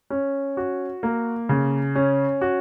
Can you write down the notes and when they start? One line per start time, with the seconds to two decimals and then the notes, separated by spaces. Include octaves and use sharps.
0.10 C#4
0.57 F#4
1.03 A#3
1.49 C#3
1.95 C#4
2.41 F#4